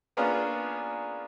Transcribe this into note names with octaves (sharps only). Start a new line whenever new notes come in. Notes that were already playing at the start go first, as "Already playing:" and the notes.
A#3 B3 C#4 D4 F4 G#4